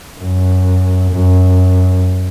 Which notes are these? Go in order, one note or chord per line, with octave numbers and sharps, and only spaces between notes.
F#2
F#2